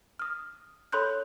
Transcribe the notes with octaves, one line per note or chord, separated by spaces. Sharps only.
D#6 F6
A4 C#5 B5 C6 F#6 G6